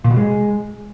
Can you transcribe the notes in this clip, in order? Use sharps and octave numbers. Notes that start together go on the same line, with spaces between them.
A#2
B2
G#3